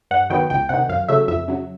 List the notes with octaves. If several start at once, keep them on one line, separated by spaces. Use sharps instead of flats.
G2 F#5
D#3 F#3 B3 G5
C#2 G5
C3 D#3 F#5
F#2 F5
C#3 F#3 A3 E5
F2 E5
C#3 F#3